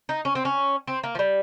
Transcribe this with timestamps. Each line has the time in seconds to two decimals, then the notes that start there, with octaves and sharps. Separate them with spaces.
0.09 D#4
0.25 C#4
0.35 C4
0.45 C#4
0.88 C4
1.03 A#3
1.15 F3
1.19 G3